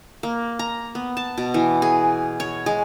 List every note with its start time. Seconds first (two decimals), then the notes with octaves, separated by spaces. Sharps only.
0.23 A#3
0.59 A#5
0.95 B3
1.17 A5
1.38 B2
1.54 E3
1.82 G#4
2.40 C#5
2.66 G#3